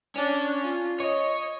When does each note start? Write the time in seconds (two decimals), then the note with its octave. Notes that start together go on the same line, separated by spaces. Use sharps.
0.16 C#4 D4
0.63 F4
1.00 C#5 D#5